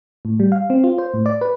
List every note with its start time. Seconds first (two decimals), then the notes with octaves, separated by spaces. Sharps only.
0.25 A2
0.40 G3
0.52 F5
0.70 C4
0.84 F4
0.98 C5
1.14 A2
1.26 D5
1.41 B4